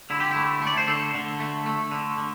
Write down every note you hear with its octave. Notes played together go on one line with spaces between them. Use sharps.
D3 E4
G4
A3 E4
A3 D5
C5
D3 A4
D3
A3
A3
D3
D3